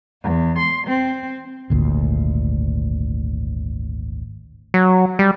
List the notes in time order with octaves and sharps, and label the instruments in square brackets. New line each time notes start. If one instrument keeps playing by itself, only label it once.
[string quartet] E2
C6
C4
[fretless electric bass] G#1 D2 A#2
[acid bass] F#3
G3